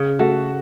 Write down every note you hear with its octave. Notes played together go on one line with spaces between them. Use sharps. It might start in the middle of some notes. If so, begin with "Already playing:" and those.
Already playing: C#3
A3 F#4